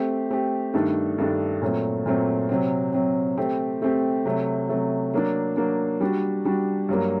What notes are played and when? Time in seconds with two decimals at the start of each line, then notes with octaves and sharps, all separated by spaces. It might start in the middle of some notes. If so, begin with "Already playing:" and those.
Already playing: A3 C4 G4
0.30 A3 C4 G4
0.74 G2 D#3 A3 D4 A4
1.18 G2 D#3 A3 D4 A4
1.62 A#2 F#3 A3 C4
2.06 A#2 F#3 A3 C4
2.49 C3 F#3 C4
2.93 C3 F#3 C4
3.37 A3 C4 G4
3.82 A3 C4 G4
4.25 C3 F#3 A3
4.69 C3 F#3 A3
5.14 F#3 A#3 D4
5.57 F#3 A#3 D4
6.00 G3 D4 F#4
6.45 G3 D4 F#4
6.89 G2 F#3 A#3